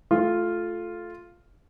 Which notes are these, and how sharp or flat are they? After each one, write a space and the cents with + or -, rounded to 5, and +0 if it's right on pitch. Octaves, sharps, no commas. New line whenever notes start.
A3 -15 F4 +0